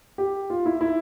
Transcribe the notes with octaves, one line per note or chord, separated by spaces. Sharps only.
G4
F4
E4
E4